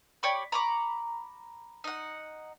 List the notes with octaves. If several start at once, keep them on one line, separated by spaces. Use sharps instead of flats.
G4 C#5 D5 B5
A#5 B5 C#6 D6
D#4 F#5